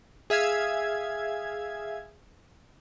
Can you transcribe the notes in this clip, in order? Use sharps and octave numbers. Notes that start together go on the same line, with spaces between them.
G#4 E5 F5 G#6